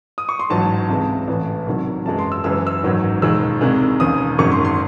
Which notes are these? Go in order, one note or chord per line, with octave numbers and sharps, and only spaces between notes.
D#6
C#6
C6
A1 G#2 F#3 A5
C#2 C3 E3 G#3
A1 A2 E3
C2 C3 D#3 F#3
G#1 F#2 E3 G#3 A5
C6
E6
F#1 F#2 E3 G#3 E6
E6
A1 G#2 D#3 F#3
E1 D#2 D#3 G#3 E6
C2 C3 D#3 G#3
E1 D#2 C#3 D#6
G#1 F#2 D#3 G#3 C#6
C6
C6